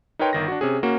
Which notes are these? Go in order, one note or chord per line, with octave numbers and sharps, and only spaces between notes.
D#4 A#4 B4 C#5 G5 C6
G1 D#3 A#6
D4 F#4
C3 C#4 G#4
A#3 C#4 F#4